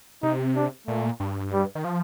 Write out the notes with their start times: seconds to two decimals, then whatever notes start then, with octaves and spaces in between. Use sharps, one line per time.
0.23 C3 D#4
0.56 D4
0.87 A#2 A3
1.20 G2
1.53 G3
1.75 D#3
1.84 F3